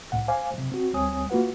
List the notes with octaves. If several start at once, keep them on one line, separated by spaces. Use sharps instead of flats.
C2 A2 F#5
C5 F5 G#5 D6
F#2 C3
C4 F#4
D2 G3 C4 C#5 G#5 D#6
A#3 F4 F#4 B4 F#5